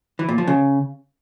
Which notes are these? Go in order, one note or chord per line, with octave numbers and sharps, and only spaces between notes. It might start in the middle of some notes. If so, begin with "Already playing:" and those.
E3
A#2
F3
C#3